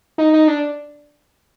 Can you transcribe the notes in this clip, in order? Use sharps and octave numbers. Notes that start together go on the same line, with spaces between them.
D#4
D#4
D4